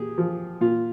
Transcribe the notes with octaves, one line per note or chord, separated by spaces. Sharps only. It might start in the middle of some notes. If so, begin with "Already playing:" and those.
Already playing: A#2 G4 G#4
F3
A#2 F4